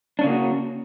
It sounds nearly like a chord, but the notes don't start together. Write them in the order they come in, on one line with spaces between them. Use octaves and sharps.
D4 C#4 C#3 A#3 F#4